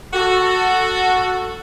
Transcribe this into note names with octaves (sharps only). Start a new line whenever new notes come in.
F#4 A4